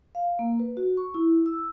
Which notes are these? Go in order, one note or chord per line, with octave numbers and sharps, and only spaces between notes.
F5
A#3
B4
F#4
C#6
E4
E6